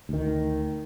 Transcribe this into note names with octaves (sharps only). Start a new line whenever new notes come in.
D2 D#3